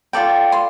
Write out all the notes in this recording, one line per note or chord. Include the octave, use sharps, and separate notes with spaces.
F4 A4 D5 G5
C6